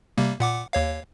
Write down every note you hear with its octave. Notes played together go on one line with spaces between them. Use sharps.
C3 G3 A#3
A#2 F#5 D6
D#2 C#5 F5